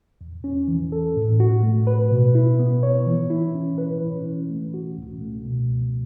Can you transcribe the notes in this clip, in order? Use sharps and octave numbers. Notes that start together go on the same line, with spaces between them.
E2
C#4
E3
A4
A2
F#4
A3
B4
B2
E4
B3
C#5
E3
E4
C#4
B4
E3
C#4
A3
F#4
C#2
A3
B2
C#2